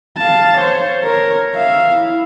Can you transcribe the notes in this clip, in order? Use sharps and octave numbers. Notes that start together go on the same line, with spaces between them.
F5 A5
C5 C#5
A#4 C#5
E5 F5
E4